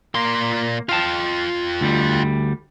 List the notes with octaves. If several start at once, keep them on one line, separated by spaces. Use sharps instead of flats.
A#2 A#3 C6
F4 F5 G5 A5
D2 G3